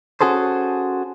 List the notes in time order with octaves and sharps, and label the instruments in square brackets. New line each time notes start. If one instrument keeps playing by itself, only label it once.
[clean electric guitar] C#4 F#4 G#4 A4 C5